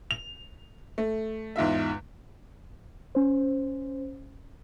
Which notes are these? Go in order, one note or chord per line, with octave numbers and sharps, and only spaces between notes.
F7
A3
E2 G#2 F4 E5
C#4 C5